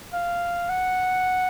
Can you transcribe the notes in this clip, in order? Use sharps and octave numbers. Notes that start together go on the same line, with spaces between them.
F5
F#5